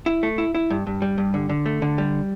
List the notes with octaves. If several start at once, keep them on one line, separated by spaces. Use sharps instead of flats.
E4
A3
E4
E4
G2
G2
G3
G2
D3
D3
A3
D3
G3